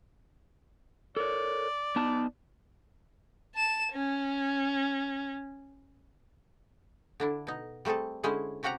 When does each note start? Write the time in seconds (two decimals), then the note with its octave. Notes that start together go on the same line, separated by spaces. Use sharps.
1.17 A4 A#4 C#5 D5
1.96 B3 D#4 A5
3.55 A5 E7
3.92 C#4
7.20 D3 D4 E4
7.47 B2 D#4
7.85 G3 A3 C4 G#4 A4
8.23 D3 G#3 C#4 E4 G#4 C5
8.63 C3 C#4 F#4 G4 F#5 A#5